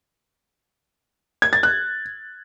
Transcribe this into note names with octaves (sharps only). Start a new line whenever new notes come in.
G#6
A6
F#6